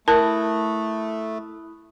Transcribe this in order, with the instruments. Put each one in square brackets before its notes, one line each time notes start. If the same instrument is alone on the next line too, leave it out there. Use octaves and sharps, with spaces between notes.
[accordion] A3 [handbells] E4 D#6 F#6 [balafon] A#4 [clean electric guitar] A5